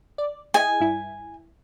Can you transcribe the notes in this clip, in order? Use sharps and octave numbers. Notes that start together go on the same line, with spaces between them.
D5
E4 G#4 D#5 G#5
G2 E4